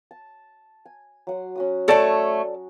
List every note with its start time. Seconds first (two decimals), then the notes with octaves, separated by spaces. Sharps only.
0.11 A5
0.85 G#5
1.27 F#3 F#5 C6
1.56 C#4 F#4 D#6
1.88 A3 A4 C#5 D5 A5